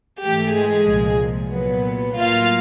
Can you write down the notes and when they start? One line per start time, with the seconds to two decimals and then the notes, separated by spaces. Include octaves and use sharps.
0.22 G#2 E3 A3 G4
0.55 G#3 G#4
0.88 C2 A#2 F3
1.52 A#2 F#3 B3
2.18 A2 F#3 A#3 F4 F5